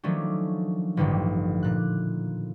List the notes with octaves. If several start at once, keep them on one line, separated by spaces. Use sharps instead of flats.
D#3 F3 F#3 A3 C#4 D4
A1 G2 D3 D#3 F3
A#2 F#6